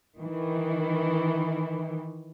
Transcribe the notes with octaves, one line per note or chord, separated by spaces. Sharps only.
D#3 E3